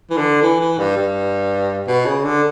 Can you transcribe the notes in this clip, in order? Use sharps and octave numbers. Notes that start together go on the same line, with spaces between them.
E3
D3
E3
E3
G2
G2
B2
C#3
D3